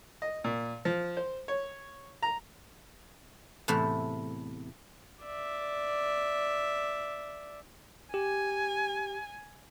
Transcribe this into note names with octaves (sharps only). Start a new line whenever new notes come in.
D#5
A#2
F3
C5
C#5
A#5
E2 A2 C3 A3 E4
D5 E5
G4 G#5